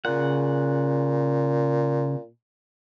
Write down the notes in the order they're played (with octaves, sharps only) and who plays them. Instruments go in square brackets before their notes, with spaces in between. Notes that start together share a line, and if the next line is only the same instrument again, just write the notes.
[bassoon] A#2 [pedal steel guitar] C#3 F#5